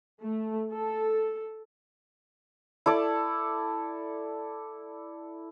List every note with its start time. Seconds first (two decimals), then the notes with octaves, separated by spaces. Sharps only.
0.21 A3
0.73 A4
2.86 E4 A4 D5